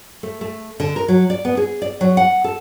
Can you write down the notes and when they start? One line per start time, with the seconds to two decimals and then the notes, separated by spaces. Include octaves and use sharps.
0.23 A3
0.41 A3
0.80 D3
0.96 A#4
1.08 F#3
1.30 D5
1.45 B3
1.57 G#4
1.82 D5
2.01 F#3
2.17 F#5
2.44 A4